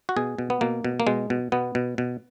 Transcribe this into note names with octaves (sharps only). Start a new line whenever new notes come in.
F#4
B2 G#4
B2
B3
B2 A#3
B2
A#3
B2 G#3
B2
B2 B3
B2
B2